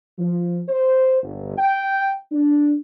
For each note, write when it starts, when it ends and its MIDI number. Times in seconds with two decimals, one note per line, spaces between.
0.19 0.61 53
0.69 1.22 72
1.22 1.54 31
1.58 2.15 79
2.32 2.76 62